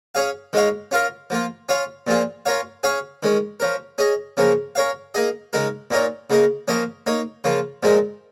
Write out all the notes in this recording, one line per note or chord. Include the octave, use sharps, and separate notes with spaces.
C#4 G#4 C#5 F5
D#3 G#3 D#4 C#5 F5
C#4 F4 A#4 F5
F3 A#3 F4
C#4 F4 C#5 F5
A#2 F3 A#3 F4 G#4
C#4 F4 A#4 C#5 F5
C#4 G#4 C#5 F5
D#3 G#3 C#4
F3 C#4 A#4
C#4 G#4 D#5
C#3 F3 A#3 C#4 A#4
C#4 A#4 C#5 F5
A#3 D#4 G#4 D#5
C#3 G#3 D#4 A#4
A#2 A#3 D#4 A#4 C#5
C#3 A#3 D#4 A#4
F3 A#3 C#4 A#4 D#5
A#3 D#4 C#5
C#3 F3 A#3 F4
A#2 F3 G#3 D#4 A#4